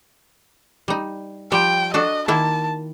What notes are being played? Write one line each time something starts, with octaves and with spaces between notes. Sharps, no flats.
G3 D#4
F3 G3 G4 G5
D4 F#4 A4 D#5
D#3 A#3 E4 A5